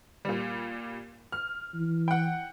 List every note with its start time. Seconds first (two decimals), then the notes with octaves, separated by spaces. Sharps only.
0.25 A#2 G3
1.32 F6
1.74 E3
2.08 F#5 G5